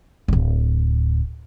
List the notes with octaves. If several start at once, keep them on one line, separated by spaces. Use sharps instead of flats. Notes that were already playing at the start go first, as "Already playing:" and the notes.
D1 G1